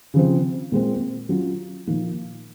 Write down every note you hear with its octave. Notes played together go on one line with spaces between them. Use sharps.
C#3 F3 C4
A#2 G#3 C4
F#3 C#4 F4
A#2 F3 A#3 D#4